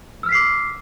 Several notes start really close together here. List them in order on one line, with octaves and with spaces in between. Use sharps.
E6 F6 B6 C7 D6